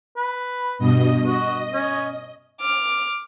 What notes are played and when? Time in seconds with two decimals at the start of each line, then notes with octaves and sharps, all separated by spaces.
0.17 B4
0.78 G2 B2 D#5
1.26 F#4 D#5
1.73 C#4
2.61 D6 F6